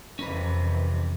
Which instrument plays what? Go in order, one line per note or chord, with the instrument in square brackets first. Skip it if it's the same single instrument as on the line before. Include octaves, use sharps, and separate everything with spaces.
[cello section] F2 C3 E3 [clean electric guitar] C#4 A#4 B4